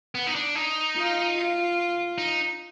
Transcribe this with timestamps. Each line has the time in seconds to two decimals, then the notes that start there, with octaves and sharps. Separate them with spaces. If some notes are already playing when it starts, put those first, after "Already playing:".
0.15 B3
0.27 D#4
0.35 D4
0.55 D#4
0.97 F4
1.37 F4
2.18 D#4